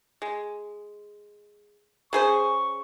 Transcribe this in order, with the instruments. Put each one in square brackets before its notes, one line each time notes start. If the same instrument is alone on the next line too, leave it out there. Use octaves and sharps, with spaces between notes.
[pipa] G#3
[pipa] C#3 G#4 C5 [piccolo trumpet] C#6